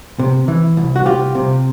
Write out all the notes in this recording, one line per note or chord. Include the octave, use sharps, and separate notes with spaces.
C3
E3
C2
F#4
C2 F4 G4
C3